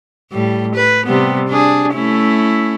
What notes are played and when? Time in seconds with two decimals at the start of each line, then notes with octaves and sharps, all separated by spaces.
0.32 A2 G3
0.75 B4
1.06 C3 G3 B3
1.49 D4 G#4
1.94 A3 C#4 E4